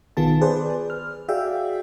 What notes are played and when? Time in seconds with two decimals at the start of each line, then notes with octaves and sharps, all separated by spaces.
0.17 B1 D#3 B3 F4 G#4 A5
0.41 G#4 B4 C5 D5
0.90 F6
1.28 F#4 G#4 D5 E5 F5 G5